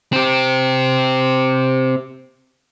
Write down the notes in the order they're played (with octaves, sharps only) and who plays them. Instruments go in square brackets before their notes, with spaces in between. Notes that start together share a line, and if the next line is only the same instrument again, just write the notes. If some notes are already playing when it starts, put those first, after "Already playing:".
[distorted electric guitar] C4 G4